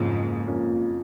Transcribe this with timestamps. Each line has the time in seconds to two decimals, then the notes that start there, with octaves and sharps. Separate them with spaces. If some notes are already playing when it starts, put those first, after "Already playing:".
Already playing: F#1 F2 G#2 F3 A#3 C#4
0.48 F3 A#3 C#4